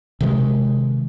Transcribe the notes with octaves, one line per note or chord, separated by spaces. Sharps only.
C3 D#3 G#3